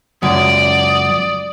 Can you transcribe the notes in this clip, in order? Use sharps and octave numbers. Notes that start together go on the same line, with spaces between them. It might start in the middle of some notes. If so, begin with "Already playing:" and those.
C#2 F#2 D5 D#6